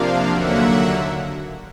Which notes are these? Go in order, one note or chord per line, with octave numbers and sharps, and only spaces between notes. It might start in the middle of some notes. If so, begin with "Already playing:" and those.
Already playing: C3 F3 A#3 D4 F5
D#2 D3 F#3 A#3 E5 F#5